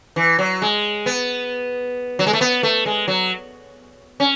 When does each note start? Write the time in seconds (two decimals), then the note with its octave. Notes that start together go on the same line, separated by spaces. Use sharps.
0.16 E3
0.39 F#3
0.62 G#3
1.06 B3
2.19 F#3
2.27 G#3
2.33 A3
2.41 B3
2.63 A3
2.86 G#3
3.08 F#3
4.20 C#4